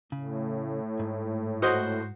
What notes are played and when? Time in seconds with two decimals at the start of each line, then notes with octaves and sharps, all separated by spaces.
0.12 A2 C#3
0.99 G#2
1.62 F#4 C5 D#5